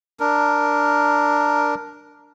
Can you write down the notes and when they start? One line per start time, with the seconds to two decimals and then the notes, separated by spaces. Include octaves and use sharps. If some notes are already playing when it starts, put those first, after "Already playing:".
0.20 D4 A#4